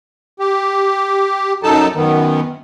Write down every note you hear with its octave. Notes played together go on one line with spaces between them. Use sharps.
G4
F#2 F#3 D#4 A4 A5
F#2 D#3 B3